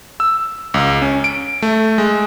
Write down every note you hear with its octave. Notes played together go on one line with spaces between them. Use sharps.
E6
C#2
C#4
D7
A3
G#3